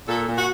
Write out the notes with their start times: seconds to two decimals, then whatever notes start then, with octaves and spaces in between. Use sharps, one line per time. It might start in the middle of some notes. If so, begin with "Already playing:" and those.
0.08 A#2 A4
0.27 A#2
0.37 F#4